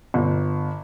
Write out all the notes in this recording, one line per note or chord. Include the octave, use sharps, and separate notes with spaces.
G1